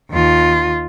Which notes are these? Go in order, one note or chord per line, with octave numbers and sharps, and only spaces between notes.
D#2 F4